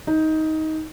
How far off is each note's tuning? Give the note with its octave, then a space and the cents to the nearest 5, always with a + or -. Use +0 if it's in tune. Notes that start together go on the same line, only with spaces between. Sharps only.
D#4 +15